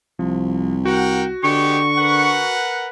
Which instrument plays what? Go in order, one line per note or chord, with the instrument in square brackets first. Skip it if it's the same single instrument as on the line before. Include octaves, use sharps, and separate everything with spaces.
[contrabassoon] C2 [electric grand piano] F3
[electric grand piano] F#4 [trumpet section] A#4 F#5 G5
[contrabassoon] D3 [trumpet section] G#3 B3 G4 [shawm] C#6
[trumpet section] A#4 B4 F#5